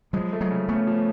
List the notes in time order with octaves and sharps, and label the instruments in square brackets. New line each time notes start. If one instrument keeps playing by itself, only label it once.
[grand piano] F3 [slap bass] F#3 G#3
[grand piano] A3
[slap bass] F#3 G#3
[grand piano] C#3
[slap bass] A3 B3 [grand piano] C#4
[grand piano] F3